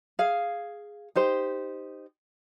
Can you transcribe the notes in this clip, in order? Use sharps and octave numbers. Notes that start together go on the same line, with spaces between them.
G#4 F5
D#4 G4 C5